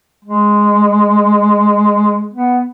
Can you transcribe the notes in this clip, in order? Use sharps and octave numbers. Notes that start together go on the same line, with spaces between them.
G#3
B3